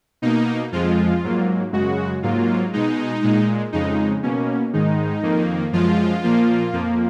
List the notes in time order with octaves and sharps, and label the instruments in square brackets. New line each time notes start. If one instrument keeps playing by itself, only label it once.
[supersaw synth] B2 A#3 D#4
F2 F3 G#3 F4
G#2 F#3 A#3
F#2 C#3 G#3 F#4
G#2 F#3 A#3 F4
B2 G#3 D#4
A#2 G#3
F2 C#3 G#3 D#4
B2 A#3 C#4
G#2 D#3 G#3 D#4
F2 D#3 A#3
F#2 F3 G#3 F4
A#2 F3 A#3
F2 F3 A#3